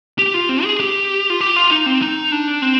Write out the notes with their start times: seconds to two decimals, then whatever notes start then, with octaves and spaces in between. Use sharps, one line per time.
0.18 G4
0.34 F4
0.49 C4
0.64 G#4
0.80 G4
1.30 F4
1.40 G4
1.56 F4
1.71 D#4
1.86 C4
2.02 D#4
2.32 D4
2.62 C4